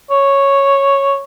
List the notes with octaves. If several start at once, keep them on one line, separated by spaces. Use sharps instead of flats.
C#5